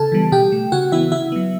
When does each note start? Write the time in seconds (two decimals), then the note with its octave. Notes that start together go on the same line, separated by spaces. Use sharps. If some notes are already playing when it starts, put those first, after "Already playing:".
Already playing: C#3 A4 A5
0.12 E3 G3 B3
0.32 B2 G4 G5
0.52 A3
0.72 C#3 F#4 F#5
0.92 E3 B3 E4 E5
1.12 C#3 E4 E5
1.32 F#3 B3